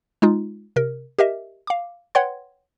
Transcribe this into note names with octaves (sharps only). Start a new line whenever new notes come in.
G#3 D#4 F4
C3 A#4
G4 A#4 D#5 E5
F5 D6
B4 C#5 F#5 G5 C6 G#6